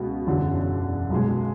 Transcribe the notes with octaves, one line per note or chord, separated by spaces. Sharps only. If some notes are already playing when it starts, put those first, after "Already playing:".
Already playing: C#2 B2
F#1 E2 D3 F#3
B1 B2 G#3